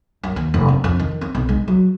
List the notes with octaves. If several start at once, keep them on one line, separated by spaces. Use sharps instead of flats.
F#2
D#2
F1
C4
F2
D#3
C4
B1
G#3
F#3